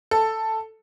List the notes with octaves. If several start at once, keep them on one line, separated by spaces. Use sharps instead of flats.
A4